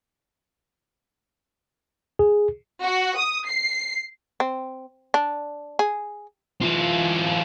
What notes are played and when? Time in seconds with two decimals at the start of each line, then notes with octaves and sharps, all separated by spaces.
2.19 G#4
2.82 F#4
3.17 D#6
3.48 C7
4.40 C4
5.14 D4
5.79 G#4
6.61 E3 F4